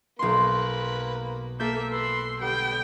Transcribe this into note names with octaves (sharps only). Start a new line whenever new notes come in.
B1 A#3 B4 C6
A#3 A4 E5 G6
B4 C6 E6
D3 G3 B3 G5